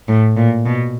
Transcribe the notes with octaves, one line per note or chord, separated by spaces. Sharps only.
A2
A#2
B2